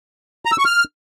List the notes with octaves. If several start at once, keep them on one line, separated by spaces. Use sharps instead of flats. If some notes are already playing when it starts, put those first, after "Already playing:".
A#5
E6
C#6
F6